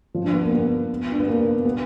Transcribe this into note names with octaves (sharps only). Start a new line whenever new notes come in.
F3
D4
B3
A#3
B3
D4
B3
A#3
B3